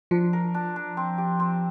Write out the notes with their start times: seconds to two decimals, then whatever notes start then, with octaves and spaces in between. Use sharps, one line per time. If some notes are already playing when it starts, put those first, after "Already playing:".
0.11 F3 D4
0.33 A#4
0.54 D4
0.76 D4
0.97 C4
1.18 G4
1.40 C4